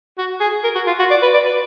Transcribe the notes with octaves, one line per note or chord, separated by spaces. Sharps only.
F#4
G#4
A#4
F#4
F4
F#4
D5
B4
D5
B4